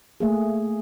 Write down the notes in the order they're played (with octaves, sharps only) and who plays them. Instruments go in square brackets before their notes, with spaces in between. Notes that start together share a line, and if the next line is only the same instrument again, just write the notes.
[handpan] A3 A#3 G#4